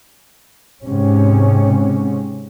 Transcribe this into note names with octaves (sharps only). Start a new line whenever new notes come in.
G#2 C3 C#4